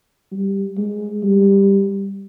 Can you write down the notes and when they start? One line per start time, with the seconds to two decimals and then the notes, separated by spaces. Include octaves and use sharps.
0.32 G3
0.77 G#3
1.23 G3